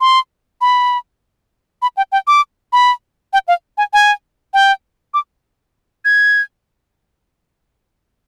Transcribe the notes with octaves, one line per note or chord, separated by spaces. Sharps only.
C6
B5
B5
G5
G5
D6
B5
G5
F5
G#5
G#5
G5
D6
G#6